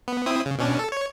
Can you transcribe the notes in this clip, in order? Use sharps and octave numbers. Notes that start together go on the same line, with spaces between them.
B3
C4 E4 D#6
C#3
B2 C#4 D4
A4
C#5